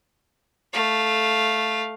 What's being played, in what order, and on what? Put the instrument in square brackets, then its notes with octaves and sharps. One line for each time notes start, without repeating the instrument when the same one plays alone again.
[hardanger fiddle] A3 F5